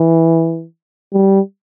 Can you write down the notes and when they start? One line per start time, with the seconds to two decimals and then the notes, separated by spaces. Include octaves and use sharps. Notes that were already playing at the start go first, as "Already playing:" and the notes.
Already playing: E3
1.13 G3